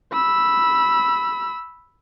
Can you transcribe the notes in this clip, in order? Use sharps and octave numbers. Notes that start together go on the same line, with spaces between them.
B5 E6